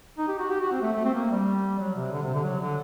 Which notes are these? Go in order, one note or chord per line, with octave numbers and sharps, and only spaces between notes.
D#4
G4
F#4
G4
F#4
C4
A3
A3
C4
A#3
G3
F#3
C3
D3
C3
D3
F#3
D3